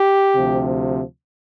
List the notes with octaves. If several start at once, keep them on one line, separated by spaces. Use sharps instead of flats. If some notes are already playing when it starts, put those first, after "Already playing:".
Already playing: G4
D2 C3 F3